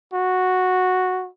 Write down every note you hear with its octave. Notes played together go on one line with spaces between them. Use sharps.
F#4